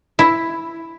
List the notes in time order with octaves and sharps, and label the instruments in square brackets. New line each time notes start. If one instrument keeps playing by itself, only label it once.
[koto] E4